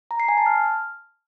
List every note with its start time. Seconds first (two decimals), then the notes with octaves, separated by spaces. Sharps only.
0.11 A#5
0.20 C7
0.28 G#5
0.37 A5
0.46 F6